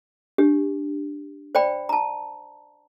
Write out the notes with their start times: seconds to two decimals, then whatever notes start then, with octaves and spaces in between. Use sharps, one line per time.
0.38 D4 G4
1.55 C5 D5 G5 B5
1.89 A5 A#5